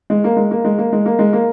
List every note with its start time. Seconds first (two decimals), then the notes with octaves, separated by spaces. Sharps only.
0.10 G#3
0.24 A#3
0.37 G#3
0.51 A#3
0.65 G#3
0.78 A#3
0.93 G#3
1.06 A#3
1.19 G#3
1.33 A#3